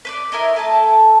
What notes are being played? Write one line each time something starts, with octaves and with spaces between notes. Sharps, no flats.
B4 C5 D5
E4 A#4 C#5 D#5
A3 A4 G#5 A5